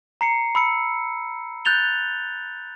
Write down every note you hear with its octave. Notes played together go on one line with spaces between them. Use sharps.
A#5 C7 C#7
B5 E6 C#7
F#6 G6 A6 F7 G7